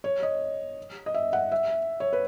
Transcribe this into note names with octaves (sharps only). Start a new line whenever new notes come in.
C#5
D#5
D#5
E5
F#5
E5
C#5
B4